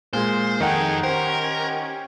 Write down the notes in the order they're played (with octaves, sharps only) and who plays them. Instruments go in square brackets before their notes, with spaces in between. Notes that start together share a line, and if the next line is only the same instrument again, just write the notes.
[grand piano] A#2 G#3 G#4 [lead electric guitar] C5
[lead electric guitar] F2 A4 [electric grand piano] D#3 F#5 [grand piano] D#4 [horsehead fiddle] G#4 G5
[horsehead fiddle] C#4 G4 [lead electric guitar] A#4 [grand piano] C5